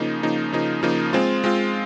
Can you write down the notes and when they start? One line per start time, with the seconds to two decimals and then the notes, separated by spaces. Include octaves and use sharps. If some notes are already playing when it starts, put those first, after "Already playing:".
Already playing: C#3 F3 A#3 D#4
0.23 C#3 F3 A#3 D#4
0.53 C#3 F3 A#3 D#4
0.83 C#3 F3 A#3 D#4
1.13 G#3 C4 F4
1.44 G#3 C4 F4